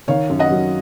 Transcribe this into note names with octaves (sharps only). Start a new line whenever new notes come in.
D#3 C#5 F5
F#2
D#5 F#5
F#3